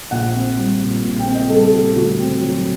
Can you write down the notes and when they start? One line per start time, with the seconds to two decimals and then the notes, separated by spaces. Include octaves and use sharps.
0.11 A#1 F#5
0.35 C4
0.57 G3
0.80 A#2
1.03 A#1
1.19 G5
1.27 C4
1.34 D#5
1.49 G3 A4
1.62 A4
1.72 A#2 G4
1.96 D2 F#4
2.19 C4
2.42 F#3